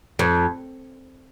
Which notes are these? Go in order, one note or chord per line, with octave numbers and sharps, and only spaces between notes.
F2